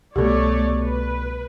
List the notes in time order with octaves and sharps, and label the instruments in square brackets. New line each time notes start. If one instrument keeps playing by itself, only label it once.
[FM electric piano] C2 B2 [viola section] A3 C#5 D5 [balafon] G4 A4
[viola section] B4